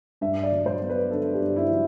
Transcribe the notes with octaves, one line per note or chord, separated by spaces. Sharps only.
G2 E5
D5
F#3
C5
B3
B4
D3 A4
G4
G2
E4
F#3